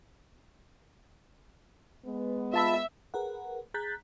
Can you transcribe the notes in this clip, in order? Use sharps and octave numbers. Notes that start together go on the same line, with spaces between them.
G#3 B3
F4 E5 A5 B5
G#4 A#4 B4 F#5
G#4 A#5 F#6 G6 A6 B6